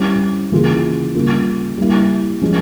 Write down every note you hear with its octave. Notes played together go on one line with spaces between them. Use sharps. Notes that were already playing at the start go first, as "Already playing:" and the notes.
Already playing: G3 C#4 E4 G4 C5
C#3 E3 A#3 F4 G#4
C#3 G3 A#3 F4
G3 A#3 E4
F3 G#3 C#4